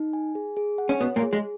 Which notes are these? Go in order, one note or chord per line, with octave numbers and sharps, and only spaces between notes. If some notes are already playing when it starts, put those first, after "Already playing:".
Already playing: D#4
G#5
G#4
G#4
F#5
C#4
B2 B3 C#5
A#2 A#3
G#4
G#3